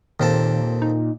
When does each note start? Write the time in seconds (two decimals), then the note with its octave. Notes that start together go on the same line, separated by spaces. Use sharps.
0.20 D#2 A#2 D#3 C4 A4
0.82 D#4